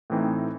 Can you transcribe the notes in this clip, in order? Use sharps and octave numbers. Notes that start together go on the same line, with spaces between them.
A2 E3 A3 C4 D#4